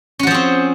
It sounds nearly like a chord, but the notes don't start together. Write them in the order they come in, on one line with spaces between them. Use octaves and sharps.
C#4 F#4 F3 G#4 C4